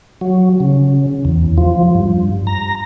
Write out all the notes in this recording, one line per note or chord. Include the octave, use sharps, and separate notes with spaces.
F#3
C#3
E2
F3
G2
A#5